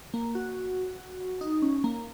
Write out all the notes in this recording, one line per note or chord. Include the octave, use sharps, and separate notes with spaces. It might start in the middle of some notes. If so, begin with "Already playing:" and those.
A#3
F#4
D#4
C#4
A#3